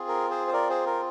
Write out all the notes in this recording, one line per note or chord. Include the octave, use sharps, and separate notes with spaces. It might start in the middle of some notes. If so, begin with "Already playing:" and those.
Already playing: C4 F4 G#4
A#4
G#4 C5
C5
A#4 D5
G#4 C5
A#4